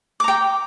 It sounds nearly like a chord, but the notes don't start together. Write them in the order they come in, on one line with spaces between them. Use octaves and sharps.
D6 A#5 G5